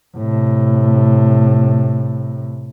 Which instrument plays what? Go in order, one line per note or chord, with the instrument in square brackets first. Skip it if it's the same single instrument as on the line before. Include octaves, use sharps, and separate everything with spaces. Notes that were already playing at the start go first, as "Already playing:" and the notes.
[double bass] A2 C3